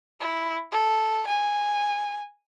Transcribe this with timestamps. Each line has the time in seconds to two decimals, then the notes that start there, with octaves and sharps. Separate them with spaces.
0.20 E4
0.72 A4
1.27 G#5